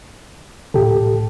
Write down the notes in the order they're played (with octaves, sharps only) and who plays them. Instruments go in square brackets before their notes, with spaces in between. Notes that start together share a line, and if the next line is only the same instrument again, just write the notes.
[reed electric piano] C#2 G4 A4 [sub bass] A2